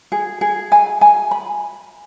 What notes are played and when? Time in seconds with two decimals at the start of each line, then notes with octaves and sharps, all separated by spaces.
0.12 G#4
0.41 G#4
0.72 G#5
1.01 G#5
1.31 B5